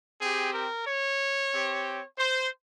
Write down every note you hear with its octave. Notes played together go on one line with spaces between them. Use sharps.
C4 G4 G#4
A#4
C#5
C4 G4
C5